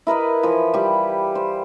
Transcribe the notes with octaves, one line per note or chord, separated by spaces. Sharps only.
E4 A#4 B4 D#5
E3 F3 B4
G3 G4
C5